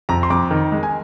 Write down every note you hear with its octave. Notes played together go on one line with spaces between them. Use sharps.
F2 A#5
C6
F2 D6
D#3
G#3
G#5